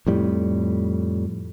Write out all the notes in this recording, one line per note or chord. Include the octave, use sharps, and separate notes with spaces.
F2 A2 G3